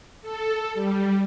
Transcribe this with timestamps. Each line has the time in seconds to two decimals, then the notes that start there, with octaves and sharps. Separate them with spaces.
0.22 A4
0.74 G3